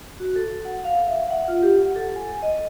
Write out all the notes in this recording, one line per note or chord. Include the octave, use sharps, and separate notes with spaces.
F#4
A4
F#5
F5
E5
F#5
F4
G4
F#5
A4
G#5
D#5